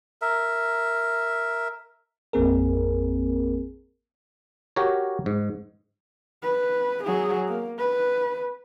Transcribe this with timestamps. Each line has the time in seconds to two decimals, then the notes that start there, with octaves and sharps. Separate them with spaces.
0.22 A#4 E5
2.33 A1 F2 A#3 C4 G#4 A#4
4.76 F#4 G4 A#4 C#5
5.26 G#2
6.43 B4
7.04 F#3 G#4
7.48 A#3
7.79 B4